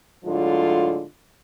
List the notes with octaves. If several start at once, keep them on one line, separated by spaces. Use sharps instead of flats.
A2 D3 F#3 G#3 F4